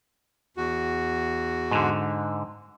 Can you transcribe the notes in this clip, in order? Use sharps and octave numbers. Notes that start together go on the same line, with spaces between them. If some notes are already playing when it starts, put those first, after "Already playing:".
E2 F#4
G#2 D3